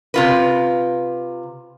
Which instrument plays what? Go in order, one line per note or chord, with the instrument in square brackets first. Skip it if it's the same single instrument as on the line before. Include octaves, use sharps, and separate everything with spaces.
[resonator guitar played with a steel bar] C3 F4 B4